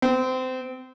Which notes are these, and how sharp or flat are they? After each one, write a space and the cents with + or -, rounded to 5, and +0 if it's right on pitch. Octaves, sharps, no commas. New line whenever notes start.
C4 -25